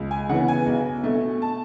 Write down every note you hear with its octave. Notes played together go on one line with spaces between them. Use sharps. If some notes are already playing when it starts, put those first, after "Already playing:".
Already playing: C#2
G#5
C#3 E3 B3 F#5
G#5
B1
B2 A3
A5